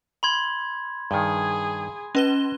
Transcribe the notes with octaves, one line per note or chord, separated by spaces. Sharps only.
B5 C6 G#6
G2 D#3 G#4
C#4 B4 D#5 G7